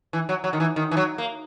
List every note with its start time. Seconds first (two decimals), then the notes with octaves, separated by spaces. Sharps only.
0.13 E3
0.29 F#3
0.44 F#3
0.53 D#3
0.60 E3
0.76 D#3
0.91 E3
0.97 F#3
1.18 A#3